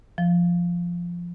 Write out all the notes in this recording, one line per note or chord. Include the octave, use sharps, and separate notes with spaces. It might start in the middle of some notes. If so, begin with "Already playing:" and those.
F3